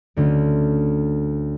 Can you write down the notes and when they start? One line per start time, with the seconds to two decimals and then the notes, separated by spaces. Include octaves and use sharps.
0.17 D2 D3 A3 C#4